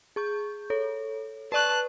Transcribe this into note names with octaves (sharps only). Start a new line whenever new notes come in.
G#4 C#6 G6
A4 C#5
B4 D5 A5 C#6 F#6